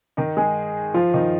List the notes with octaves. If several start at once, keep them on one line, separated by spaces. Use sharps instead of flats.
D#3 D#4
G#3 G#4
F3 F4
D#3 D#4